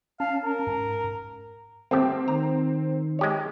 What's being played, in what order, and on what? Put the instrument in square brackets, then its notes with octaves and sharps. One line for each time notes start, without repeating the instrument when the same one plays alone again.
[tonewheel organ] C#4 A5 [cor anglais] F5
[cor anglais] A#4
[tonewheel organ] G#2
[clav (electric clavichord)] G1 A3 G4 [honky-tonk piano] C4
[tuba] D#3 [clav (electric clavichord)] A#5
[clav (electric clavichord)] G#3 G4 C#5